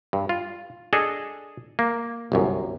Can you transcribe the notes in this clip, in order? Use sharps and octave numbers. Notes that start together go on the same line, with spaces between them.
G2
F4
D4 G#4 A4 D#5
A#3
G1 C2 F#2